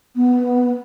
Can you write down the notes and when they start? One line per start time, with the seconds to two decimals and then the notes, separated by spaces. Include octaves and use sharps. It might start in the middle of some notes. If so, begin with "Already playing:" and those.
0.16 B3